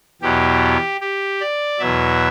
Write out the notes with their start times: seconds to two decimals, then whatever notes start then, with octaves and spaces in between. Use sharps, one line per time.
0.22 E2 B2 F#3 G4
1.01 G4
1.40 D5
1.79 E2 B2 F#3 E5